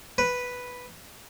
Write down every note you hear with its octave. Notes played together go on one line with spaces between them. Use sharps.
B4